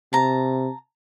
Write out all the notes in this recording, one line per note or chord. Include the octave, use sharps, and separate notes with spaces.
C3 A5 A#5